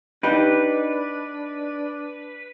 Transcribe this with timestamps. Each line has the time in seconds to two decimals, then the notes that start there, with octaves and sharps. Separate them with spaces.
0.23 D4 D#4 G4 B4